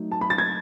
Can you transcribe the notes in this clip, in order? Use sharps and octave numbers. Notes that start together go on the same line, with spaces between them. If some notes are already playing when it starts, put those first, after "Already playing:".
Already playing: F#3 A3 D#4
A5
B5
A6
G#6